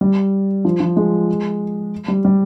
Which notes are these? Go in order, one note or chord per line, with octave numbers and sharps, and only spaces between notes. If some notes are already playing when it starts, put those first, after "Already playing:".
G3
F3
F3
G#3
G3
G3